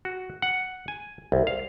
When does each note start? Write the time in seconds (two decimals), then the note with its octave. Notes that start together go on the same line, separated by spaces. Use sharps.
0.05 F#4
0.42 F#5
0.88 G#5
1.32 C2
1.47 F5